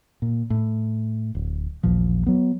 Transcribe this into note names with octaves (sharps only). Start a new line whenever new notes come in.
A#2
A2
D1
A1 D#2 A#2 F3
F#3 B3